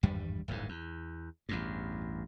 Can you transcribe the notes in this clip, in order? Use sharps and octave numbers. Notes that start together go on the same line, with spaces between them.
G#1 E2 G2 G3
D1 G1 E2 G#2
E2
A1 E2 G2